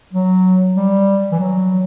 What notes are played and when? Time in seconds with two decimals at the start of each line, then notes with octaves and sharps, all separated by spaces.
0.13 F#3
0.76 G3
1.32 E3
1.40 F#3